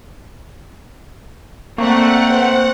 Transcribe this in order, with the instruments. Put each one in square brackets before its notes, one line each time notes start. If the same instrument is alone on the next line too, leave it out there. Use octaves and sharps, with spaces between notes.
[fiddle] A3 C4 [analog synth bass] A#3 [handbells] D5 A#5 C#6 [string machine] F#5
[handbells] B4 C5